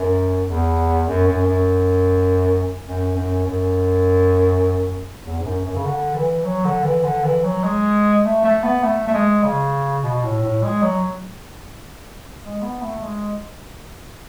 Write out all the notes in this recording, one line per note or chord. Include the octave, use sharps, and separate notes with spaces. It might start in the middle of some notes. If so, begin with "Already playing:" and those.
Already playing: F#2
E2
F#2
F#2
F#2
F#2
F#2
F#2
E2
G#2
F#2
F#2
C#3
D3
E3
F#3
D3
E3
D3
E3
F#3
G#3
A3
A3
B3
A3
A3
G#3
C#3
B2
A2
A2
G#3
F#3
G#3
B3
A3
G#3